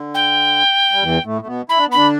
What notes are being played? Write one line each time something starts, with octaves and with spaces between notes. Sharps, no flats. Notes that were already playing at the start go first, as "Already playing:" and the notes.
Already playing: D3
G5
G3
E2 E3
A2 A3
A3
B2 B3
E4 B5
D4
B3
D3 D4 B5